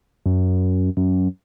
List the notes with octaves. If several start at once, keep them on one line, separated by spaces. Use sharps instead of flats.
F#2
F#2